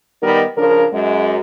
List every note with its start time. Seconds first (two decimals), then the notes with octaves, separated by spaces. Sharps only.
0.23 D#3 G3 B3 D#4 A#4
0.57 C#3 F3 D4 A#4
0.93 F#2 G#3